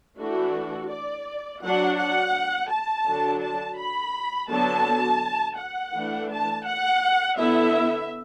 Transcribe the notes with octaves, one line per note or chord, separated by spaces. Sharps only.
E3 A3 D4 F#4
D5
F#3 D4 F#5
F#5
A5
D3 F#3 D4
A5
B5
D3 F#3 B3 A5
F#5
E3 A3 D4
A5
F#5
D3 B3 E4 E5